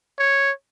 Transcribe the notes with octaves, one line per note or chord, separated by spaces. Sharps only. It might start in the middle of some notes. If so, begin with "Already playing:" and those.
C#5